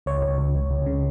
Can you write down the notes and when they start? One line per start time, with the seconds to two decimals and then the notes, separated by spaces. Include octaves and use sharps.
0.06 C#2 C#5
0.22 C#2
0.38 C#2
0.55 C#2
0.71 C#2
0.86 C#3